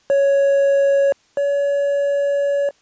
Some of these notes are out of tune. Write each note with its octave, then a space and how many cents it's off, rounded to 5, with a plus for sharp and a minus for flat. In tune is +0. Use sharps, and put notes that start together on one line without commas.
C#5 +5
C#5 +35